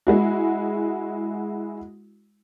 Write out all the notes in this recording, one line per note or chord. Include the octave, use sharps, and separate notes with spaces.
G#3 E4 F#4